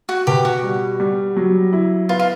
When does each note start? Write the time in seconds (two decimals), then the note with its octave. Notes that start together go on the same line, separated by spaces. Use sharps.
0.09 F#4
0.27 B2 G4
0.45 F#4
0.63 G3
1.00 G3
1.37 F#3
1.73 E4
2.09 B3 F4
2.19 F4